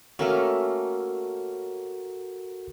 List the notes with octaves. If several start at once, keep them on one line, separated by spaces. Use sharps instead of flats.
A3 A#3 C#4 F#4 A4 A#4